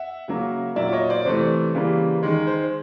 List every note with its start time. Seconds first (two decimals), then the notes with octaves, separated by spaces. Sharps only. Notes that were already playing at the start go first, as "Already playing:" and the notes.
Already playing: E5 F#5
0.28 C#3 F#3 A#3
0.76 A#2 F#3 A#3 D5 E5
0.93 C#5 D#5
1.09 C5 D5
1.25 C3 E3 A3 C5
1.74 C#3 E3 G3 A#3
2.23 D#3 G#3
2.47 C5